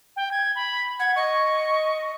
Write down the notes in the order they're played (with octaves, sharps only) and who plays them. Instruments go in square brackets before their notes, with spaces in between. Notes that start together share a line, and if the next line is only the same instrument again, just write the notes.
[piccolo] G5
G#6
B5
[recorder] F#5 [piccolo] G#6
[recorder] D#5 [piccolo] C#6